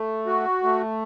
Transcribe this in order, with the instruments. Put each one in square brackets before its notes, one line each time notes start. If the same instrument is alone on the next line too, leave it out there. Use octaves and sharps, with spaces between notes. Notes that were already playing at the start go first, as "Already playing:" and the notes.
Already playing: [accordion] A3
F#4
A3